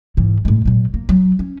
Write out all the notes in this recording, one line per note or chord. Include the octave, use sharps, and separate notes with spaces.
G#2 E3
A2 G#3
A#2 F#3
A#3
F#3
C#4